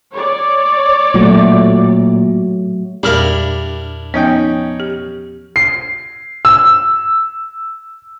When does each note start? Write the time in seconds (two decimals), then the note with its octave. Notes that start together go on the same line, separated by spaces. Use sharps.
0.12 C#5 D5
1.14 A#2 F#3 A3 F#4
3.03 E2 A#2 G3 D4 E4 A#4 F6
4.14 F3 B3 C#4 D#4 G5
4.80 G4
5.56 C7
6.45 E6